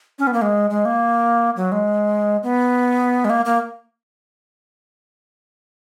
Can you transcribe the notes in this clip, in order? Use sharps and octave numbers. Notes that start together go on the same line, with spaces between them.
C#4
B3
A#3
G#3
G#3
A#3
F#3
G#3
B3
G#3
A#3
A#3